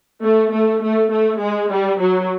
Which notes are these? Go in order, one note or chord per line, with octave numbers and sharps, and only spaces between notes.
A3
A3
A3
A3
G#3
G3
F#3